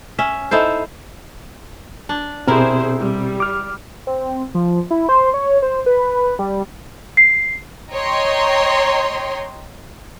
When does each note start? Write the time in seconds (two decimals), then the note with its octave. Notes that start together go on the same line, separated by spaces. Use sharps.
0.19 C#4 E5
0.51 D#4 E4 A4 C5
2.09 D4
2.48 B2 C4 E4 G4 G#4 A#4 C5
2.99 G3
3.40 D6 F6
4.07 C4
4.55 F3
4.91 E4
5.09 C5
5.34 C#5
5.62 C5
5.86 B4
6.39 G3
7.17 C7
7.93 C#5 D#5 G5 A#5 C6